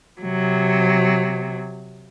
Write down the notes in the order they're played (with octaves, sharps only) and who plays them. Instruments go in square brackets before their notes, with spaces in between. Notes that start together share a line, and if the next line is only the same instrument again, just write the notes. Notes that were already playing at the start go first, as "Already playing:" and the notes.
[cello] C3 F#3